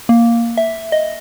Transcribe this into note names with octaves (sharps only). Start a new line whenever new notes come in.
A#3
E5
D#5